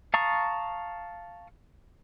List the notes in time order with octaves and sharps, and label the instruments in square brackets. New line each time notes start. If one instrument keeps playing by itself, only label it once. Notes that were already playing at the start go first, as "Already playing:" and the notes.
[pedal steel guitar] F5 A5 A#5 C#6 D#6